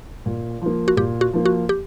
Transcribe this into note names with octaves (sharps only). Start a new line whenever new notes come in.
A#2
F3 A#3
F#4
A#2 G4
F#4
F3 A#3
F#4
G4